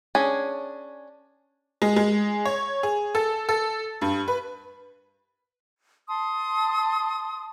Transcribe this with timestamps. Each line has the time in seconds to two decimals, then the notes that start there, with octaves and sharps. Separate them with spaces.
0.15 C#4 D4 G#4
1.82 G#3
1.96 G#3
2.45 C#5
2.83 G#4
3.15 A4
3.49 A4
4.01 G2
4.28 B4
6.08 A5 C6 D#6